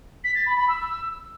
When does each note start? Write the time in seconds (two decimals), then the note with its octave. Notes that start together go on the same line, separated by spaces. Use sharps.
0.24 B6
0.35 A6
0.46 B5
0.57 B5
0.68 E6